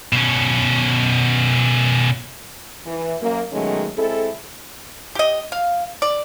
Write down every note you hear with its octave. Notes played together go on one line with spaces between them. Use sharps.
B2 C#4
E3
F#2 A#3
B2 D#3 F#3 G#3 A3 C#4
G#3 C4 E4 A4
G4 D#5
F5
D5